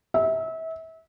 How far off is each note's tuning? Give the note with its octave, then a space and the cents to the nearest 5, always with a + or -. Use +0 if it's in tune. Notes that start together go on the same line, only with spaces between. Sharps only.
E5 -30